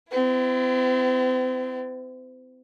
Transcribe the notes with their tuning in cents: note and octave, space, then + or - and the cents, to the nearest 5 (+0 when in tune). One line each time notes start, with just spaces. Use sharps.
C4 -40 E4 +35